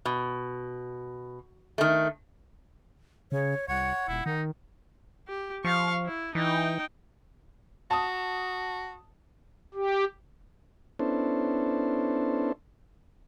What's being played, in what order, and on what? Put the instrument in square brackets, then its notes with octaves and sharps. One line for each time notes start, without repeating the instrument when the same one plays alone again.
[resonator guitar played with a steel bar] B2
D#3 A3
[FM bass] C#3 [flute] C#5
[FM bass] C2 [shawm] C#5 [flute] F#5
[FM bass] D#1 [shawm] E4
[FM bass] D#3 [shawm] D#4
[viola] G4
[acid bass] F3 [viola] F5 C#6
[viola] E4
[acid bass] E3 [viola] D#4 G5
[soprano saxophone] F#4 [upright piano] A5 D#6
[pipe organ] G4
[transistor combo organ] B3 C#4 D4 E4 A4 C5